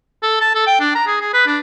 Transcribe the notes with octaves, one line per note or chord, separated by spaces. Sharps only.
A4
A5
A4
G5
D4
A#5
G#4
G#4
B4
D4